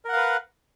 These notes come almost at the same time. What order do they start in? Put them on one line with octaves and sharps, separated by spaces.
A#4 F#5 F5 B4